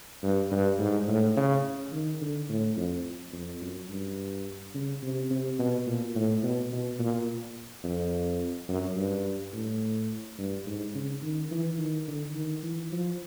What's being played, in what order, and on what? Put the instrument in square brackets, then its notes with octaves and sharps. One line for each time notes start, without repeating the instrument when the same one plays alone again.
[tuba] G2
G2
G#2
A2
C#3
D#3
D3
A2
F2
F2
F#2
G2
C#3
C3
C3
B2
A#2
A2
B2
B2
A#2
F2
F#2
G2
A2
G2
G#2
C#3
D#3
E3
D#3
D3
D#3
E3
F3